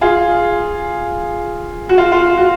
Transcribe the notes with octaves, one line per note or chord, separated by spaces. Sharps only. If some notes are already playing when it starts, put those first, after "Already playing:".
F4 G#4
F#4
F4
F4
F#4